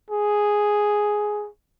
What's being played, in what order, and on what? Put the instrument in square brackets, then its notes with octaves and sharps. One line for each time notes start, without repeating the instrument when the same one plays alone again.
[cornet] G#4